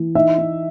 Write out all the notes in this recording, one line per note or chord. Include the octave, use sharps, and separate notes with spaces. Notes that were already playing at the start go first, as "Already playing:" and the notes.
Already playing: E3
D#4 E5
D#4